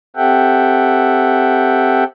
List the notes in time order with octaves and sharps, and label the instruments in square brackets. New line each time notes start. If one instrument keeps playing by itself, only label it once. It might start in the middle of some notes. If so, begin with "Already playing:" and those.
[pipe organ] C4 G4 A4 E5 F#5 G5